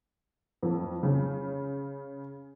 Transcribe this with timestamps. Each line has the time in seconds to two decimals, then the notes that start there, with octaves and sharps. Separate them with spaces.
0.63 F2
1.03 C#3